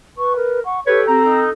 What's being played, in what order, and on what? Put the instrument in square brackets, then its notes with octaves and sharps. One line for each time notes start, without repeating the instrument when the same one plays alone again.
[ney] B4 [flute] C#6
[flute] A#4
[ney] F#5 [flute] C#6
[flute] G4 [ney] A4 [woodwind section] B4 C#5
[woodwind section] C4 A#5 [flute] G4
[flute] D#4